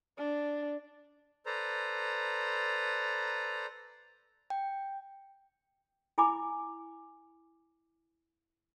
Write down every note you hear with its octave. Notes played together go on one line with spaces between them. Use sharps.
D4
A4 B4 C5 D5 A#5
G5
E4 G#5 B5 D6